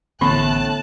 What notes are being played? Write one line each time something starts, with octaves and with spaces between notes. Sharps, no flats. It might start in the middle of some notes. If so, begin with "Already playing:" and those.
A1 A2 D3 B3 C#4 A5 B5 F#6